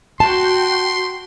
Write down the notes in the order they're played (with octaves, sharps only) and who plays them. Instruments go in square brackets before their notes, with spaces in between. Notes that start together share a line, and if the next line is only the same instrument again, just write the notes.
[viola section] F#4 G5 [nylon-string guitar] A5 [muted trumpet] C6